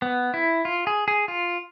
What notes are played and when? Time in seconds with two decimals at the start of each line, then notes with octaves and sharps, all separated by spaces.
0.02 B3
0.34 E4
0.65 F4
0.87 G#4
1.08 G#4
1.28 F4